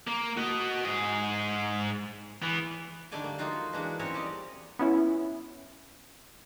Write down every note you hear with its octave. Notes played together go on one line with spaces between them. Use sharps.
A#3
F#4 D#5
G#2 G#4
E3 B3
D3 D#3 G3 A3 D5 G#5
A#3
F#3 A#3 D#4 F4 F#4
E3 G#3 A#3 D4 F#4 A#4
C4 C#4 A#4 C#5
G3 D5 D#5
B3 C#4 E4